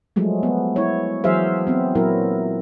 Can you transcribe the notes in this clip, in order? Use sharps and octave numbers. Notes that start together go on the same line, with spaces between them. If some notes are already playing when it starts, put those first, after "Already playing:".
F3 F#3 G#3 A3
B3
E4 C#5
E3 F#3 G#4 C5 E5 F5
B3 C4
A#2 F#3 E4 A#4